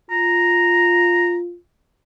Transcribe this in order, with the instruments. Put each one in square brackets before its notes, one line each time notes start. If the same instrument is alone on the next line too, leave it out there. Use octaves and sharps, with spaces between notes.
[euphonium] F4 [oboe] A#5